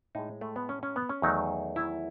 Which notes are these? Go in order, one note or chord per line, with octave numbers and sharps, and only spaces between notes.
A2 G#3 D#4
A3
B3
C#4
C#4
B3
C#4
E2 D#3 F#3 A3 D#4
E4